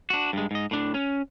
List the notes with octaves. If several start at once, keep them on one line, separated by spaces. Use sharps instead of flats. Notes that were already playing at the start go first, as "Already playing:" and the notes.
D4 F#4
G2 G#3
G#2 D#5
A2 D4
C#4